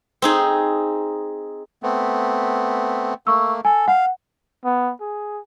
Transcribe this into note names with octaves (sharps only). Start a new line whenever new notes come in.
C4 D#4 G#4
A3 B3 C4
A3 A#3 C#6 E6
A4 G#5
F5 F#5
B3
G#4